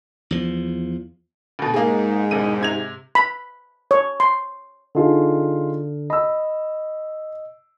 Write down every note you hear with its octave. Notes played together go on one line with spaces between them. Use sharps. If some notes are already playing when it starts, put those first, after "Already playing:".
E2 F3
D2 B2
G#2 A#3 G#4
E1 D#7
C3 G#6 F7
B5
C#5
C6
D3 D#4 F4 G#4
D#5 B5 E6